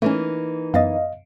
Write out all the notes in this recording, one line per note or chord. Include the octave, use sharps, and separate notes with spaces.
E3 A3 A#3 C#4 D#4
F#2 B3 D#5 F5 A6